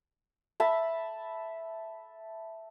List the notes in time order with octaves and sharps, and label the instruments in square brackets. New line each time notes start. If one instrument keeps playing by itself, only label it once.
[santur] E5 A5 B5